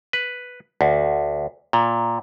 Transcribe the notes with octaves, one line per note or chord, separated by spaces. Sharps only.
B4
D2
A#2